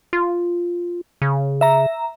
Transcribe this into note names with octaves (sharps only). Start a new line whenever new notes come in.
F4
C#3
E5 A#5